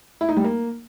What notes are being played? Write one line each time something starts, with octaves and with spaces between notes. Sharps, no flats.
E4
D#4
G3
A#3